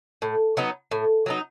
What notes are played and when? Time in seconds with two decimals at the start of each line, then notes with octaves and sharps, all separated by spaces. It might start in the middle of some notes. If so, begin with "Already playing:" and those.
0.22 A2
0.57 F#3 B3 D#4
0.91 A2
1.26 F#3 B3 D#4